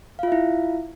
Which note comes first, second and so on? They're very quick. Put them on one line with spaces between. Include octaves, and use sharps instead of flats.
F5 F4 E5 E4